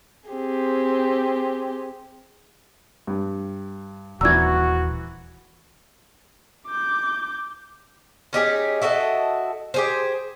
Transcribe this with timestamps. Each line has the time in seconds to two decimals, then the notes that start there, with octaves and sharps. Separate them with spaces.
0.29 C4 G4 G#4
3.07 G2
4.21 D#1 E3 F#4 D5 A#5 E6 G#6
6.67 D6 G6
8.33 C#4 D#4 G4 G#4
8.82 E4 F#4 A4 D#5
9.74 G4 G#4 C5